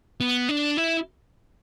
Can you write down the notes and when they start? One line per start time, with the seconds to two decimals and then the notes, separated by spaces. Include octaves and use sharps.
0.21 B3
0.49 D4
0.77 E4